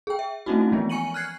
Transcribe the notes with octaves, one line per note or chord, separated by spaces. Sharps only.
G#4 G5
E5
A3 C4 C#4 D#4 E4 F#4
E3 F3 G#3 B3
G#5 C#6 C#7 D#7 F#7
F6 F#6 G#6 C7